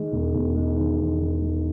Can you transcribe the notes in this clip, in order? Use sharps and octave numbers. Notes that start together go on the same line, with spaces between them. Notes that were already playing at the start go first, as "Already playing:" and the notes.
Already playing: D#3 G#3
E1
E1
G#3
D#3
E2
D#3
G#3